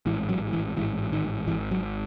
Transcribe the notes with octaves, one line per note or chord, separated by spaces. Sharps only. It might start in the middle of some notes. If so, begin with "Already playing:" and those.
A1 G#2 E3
F#3
E3
A1 G#2 E3
D#3
G#1 G#2 E3
F#3